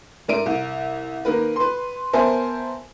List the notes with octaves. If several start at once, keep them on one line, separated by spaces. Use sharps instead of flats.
G#2 A#4 D5 E5 D7 D#7
C2
D#3 A#3 A#4 B4
B4 C6
B3 A#4 C5 E5 G#5 A5